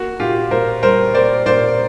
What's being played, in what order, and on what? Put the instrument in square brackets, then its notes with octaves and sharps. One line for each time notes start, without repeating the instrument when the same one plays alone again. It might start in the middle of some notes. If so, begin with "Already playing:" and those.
Already playing: [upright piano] A#3 [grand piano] F#4
[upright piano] A#2 [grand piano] F4 G4
[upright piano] A#2 [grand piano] A#4 C5
[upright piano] G3 [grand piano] A#4 C5
[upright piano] A#3 [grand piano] C5 D5
[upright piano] A#2 [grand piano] C5 D5